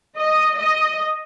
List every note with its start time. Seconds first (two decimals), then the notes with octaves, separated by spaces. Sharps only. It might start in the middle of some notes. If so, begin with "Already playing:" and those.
0.16 D#5
0.57 D#5